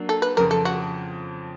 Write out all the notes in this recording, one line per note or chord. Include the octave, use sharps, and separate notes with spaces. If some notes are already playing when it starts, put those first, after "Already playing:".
Already playing: F#3 A#3 D4
A4
B4
F2 C#3 F3 A#4
A4
F#4